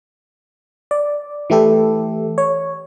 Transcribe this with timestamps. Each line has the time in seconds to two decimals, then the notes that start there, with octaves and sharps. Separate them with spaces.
0.91 D5
1.50 E3 A3 E4 G4 A4
2.38 C#5